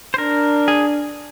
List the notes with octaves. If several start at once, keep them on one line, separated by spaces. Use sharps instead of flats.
C5
D4 A#4
G#4